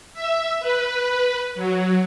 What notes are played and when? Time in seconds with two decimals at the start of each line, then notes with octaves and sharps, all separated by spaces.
0.14 E5
0.60 B4
1.55 F#3